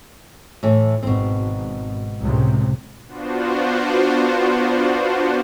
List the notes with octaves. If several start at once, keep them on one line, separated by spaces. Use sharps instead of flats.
A2 E3
G#1 B2 C4
C#2 A2 C3
B3 D4 F4 F#4 C5